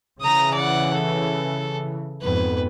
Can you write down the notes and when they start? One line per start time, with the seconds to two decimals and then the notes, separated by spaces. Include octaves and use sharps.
0.21 C#3 E3 A#5 D#6
0.54 D5 F#5
0.93 A4
2.22 F2 G#2 B3 B4